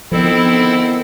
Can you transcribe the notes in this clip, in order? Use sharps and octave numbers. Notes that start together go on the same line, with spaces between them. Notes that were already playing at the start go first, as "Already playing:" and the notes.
D2 D#3 F3 B3 C4 E4 A4